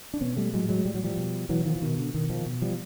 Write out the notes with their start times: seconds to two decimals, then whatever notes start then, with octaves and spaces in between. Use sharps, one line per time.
0.14 D4
0.21 B2 B3 C#4
0.37 G3 A3
0.53 A2 F#3 G#3
0.69 F#3 G#3
0.85 A2 G3
0.95 F#3
1.04 F3 G3
1.17 B2
1.49 B2 E3 F#3
1.65 D#3 F3
1.76 E3
1.81 B2 D#3
1.98 D3
2.14 B2 D#3
2.30 D#3 F3
2.46 B2
2.62 F3 G3